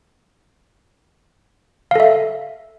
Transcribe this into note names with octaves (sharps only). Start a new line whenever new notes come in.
A4 E5 F5